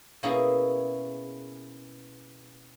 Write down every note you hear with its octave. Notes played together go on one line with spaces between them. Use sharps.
B2 A#3 C#4 E4 G#4